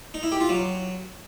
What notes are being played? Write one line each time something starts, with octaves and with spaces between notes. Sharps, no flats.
D#4
E4
G4
F4
F#3